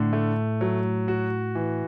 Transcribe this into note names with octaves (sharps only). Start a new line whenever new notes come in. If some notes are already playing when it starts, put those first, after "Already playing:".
Already playing: A2 D3
A3
F#3
F#4
E3